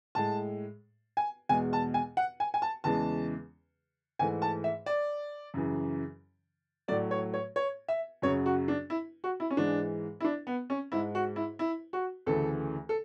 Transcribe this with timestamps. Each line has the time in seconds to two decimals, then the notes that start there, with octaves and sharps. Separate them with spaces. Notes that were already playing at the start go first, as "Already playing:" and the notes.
0.15 A2 G#3 A5
1.17 G#5
1.49 E2 B2 G#3 G#5
1.73 A5
1.94 G#5
2.17 F#5
2.40 G#5
2.54 G#5
2.62 A5
2.84 E2 C#3 E3 G#3 A5
4.19 G#2 E3 A3 G#5
4.42 A5
4.64 E5
4.86 D5
5.54 F#2 C#3 E3
6.88 A2 F#3 A3 D5
7.11 C#5
7.34 C#5
7.56 C#5
7.88 E5
8.22 F#2 C#3 F#3 C#5
8.46 F#4
8.68 D4
8.90 E4
9.24 F#4
9.40 E4
9.50 C#4
9.57 G#2 E3 G#3 D4
10.20 E4
10.24 D4
10.47 B3
10.70 C#4
10.92 G#2 G#3 E4
11.15 F#4
11.36 E4
11.59 E4
11.93 F#4
12.26 D2 C#3 E3 A3 A4
12.89 A4